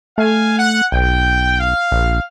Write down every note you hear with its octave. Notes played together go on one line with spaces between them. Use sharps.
A3 F5 G#5
F#5
B1 G5
F5
A#1